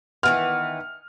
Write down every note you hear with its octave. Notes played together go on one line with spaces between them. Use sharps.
D#3 E3 B3 F6